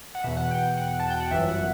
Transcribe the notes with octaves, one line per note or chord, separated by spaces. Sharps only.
F#5
E2 B2 E5
F#5
G5
G5
F#5
A5
G5
F#5
G1 F#2 E3 E5
F#5